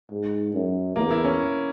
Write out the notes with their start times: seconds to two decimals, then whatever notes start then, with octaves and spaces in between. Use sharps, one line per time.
0.11 G#2
0.54 F#2
0.96 E2 A#3
1.11 E4
1.25 C#4